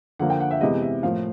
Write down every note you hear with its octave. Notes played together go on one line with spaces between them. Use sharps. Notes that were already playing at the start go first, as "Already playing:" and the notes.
D3 F3 A#3 F#5
G5
F#5
E5
C3 E3 G#3 B3 D#5
E5
A2 F3 A#3 F5